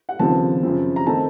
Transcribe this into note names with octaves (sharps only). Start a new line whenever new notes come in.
F#5
F1 D#2 C#3 F3 C4 A5
F#2 C#3 F3 C4
A#5
D#3 A3 C4 A5